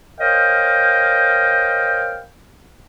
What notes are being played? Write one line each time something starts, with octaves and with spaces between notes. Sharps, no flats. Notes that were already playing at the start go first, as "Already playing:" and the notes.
A#4 C5 C#5 D#5 F5 G5